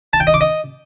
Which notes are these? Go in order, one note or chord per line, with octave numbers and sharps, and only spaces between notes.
A5
G5
D#5
D6
D#5